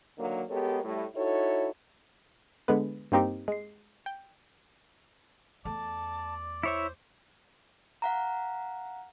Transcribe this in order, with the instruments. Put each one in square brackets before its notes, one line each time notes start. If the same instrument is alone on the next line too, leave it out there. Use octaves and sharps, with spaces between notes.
[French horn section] D3 D#3 F#3 A#3
G#3 B3 G4 A4 A#4 C#5
A2 G3
D#4 E4 F#4 A4 C#5
[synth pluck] D3 G#3 B3 B4
G2 A#3 C4 D#4 G4
G#3 C7
G5
[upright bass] E2 A3 [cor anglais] D5 [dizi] A5
[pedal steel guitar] E4 C#5 E5 [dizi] C5
[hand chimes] F5 F#5 A#5